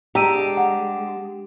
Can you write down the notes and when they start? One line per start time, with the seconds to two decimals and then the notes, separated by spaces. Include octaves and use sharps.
0.15 G#3 D4 G4 A#5 E6 D#7
0.57 F#5